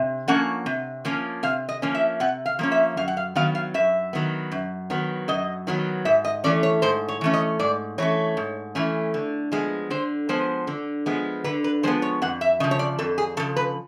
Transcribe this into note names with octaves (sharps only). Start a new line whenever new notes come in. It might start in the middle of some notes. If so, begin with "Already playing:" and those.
Already playing: C3
F3 A#3 C#4 F#5
C3
F3 A#3 C#4
C3 F5
D#5
F3 A#3 C#4
E5
C3 F#5
F5
F3 A#3 C#4
E5
F#2 F5
F#5
F5
D#3 F#3 B3 F5
F5
F#2 E5
D#3 F#3 B3
F#2
D#3 F#3 B3
F#2 D#5
D#3 F#3 B3
G#2 E5
D#5
E3 A3 C#4 D5
C#5
G#2 C5
C#5
E3 A3 C#4
D#5
G#2 D5
E3 A3 C#4 C#5
G#2
E3 A3 C#4
D3
F3 G#3 B3
D3 C5
F3 G#3 B3 C5
D3
F3 G#3 B3
D3 B4
B4
F3 G#3 B3 C5
C#5
F2 F#5
E5
C#3 F3 D#5
C#5
D5
F2 A4
G#4
C#3 F3 A4
B4